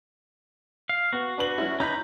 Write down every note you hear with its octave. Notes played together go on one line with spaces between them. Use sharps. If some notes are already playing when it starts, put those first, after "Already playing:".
F5
B3 F#4
D4 B4 F#7
F#3 C#4 E4
C#4 D#4 B4 A#5 G6